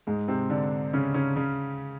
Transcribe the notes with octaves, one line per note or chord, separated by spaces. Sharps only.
G#2 G#3
C3 C4
D3 D4
C#3 C#4
C#3 C#4
C#3 C#4